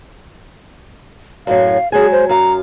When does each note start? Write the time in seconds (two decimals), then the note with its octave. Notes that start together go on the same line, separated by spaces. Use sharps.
1.47 F#2 A2 F#3 F5
1.92 F#3 G#3 G#4 G#5
2.12 C5
2.29 F#2 F5 A#5